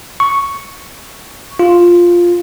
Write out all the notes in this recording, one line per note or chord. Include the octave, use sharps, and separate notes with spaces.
C#6
F4